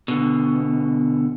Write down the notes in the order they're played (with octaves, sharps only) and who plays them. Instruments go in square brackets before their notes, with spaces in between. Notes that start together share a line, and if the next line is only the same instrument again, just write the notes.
[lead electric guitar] B2 D3